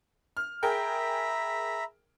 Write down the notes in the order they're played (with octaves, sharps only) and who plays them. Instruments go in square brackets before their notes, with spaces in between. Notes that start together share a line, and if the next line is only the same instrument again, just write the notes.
[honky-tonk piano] F6
[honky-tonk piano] G#4 A#4 G5 [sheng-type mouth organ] E5 A#5 B5